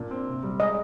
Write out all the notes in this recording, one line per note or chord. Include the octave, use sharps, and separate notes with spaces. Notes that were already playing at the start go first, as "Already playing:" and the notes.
Already playing: A#2 D4
C4
C3
G3
G#3 D#5